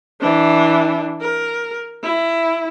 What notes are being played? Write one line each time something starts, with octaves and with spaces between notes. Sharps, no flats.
E3 D4
A#4
E4